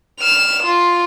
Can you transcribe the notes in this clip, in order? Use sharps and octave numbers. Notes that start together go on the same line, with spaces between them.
F6 E7
F4